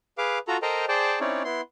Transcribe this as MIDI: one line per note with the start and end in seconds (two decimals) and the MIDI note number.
0.18 0.39 68
0.18 0.39 71
0.18 0.39 77
0.18 0.39 86
0.48 0.57 65
0.48 0.57 66
0.48 0.57 69
0.48 0.57 82
0.62 0.85 69
0.62 0.85 70
0.62 0.85 72
0.62 0.85 75
0.62 0.85 79
0.62 0.85 82
0.88 1.19 68
0.88 1.19 72
0.88 1.19 74
0.88 1.19 79
0.88 1.19 81
1.20 1.43 60
1.20 1.43 61
1.20 1.43 63
1.20 1.43 64
1.20 1.43 73
1.20 1.43 74
1.44 1.61 59
1.44 1.61 64
1.44 1.61 84